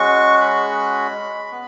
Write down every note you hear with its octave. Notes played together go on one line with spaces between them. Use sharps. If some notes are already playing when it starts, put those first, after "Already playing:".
Already playing: G#3 C#4 F#4 C#6
B5
B3